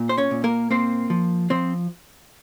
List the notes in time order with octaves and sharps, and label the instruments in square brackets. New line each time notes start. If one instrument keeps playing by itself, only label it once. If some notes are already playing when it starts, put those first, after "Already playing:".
Already playing: [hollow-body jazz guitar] A#2
C5
C#4 C#5
A#2
A#3 A#4
A#3 C4 C5
F3
F3 C4 C5